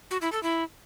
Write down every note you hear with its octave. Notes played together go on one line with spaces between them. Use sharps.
F#4
E4
A4
E4